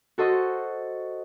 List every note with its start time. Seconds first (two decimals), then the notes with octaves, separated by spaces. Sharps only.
0.18 F#4 A4 C5 D#5